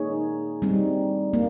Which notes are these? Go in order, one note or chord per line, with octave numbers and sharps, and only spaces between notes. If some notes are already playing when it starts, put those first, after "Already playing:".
Already playing: A#3 D#4 G#4 C#5
G3 C4 D#4
A#3